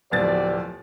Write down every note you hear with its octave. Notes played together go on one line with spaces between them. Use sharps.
D1 F2 B2 G4 D5 A6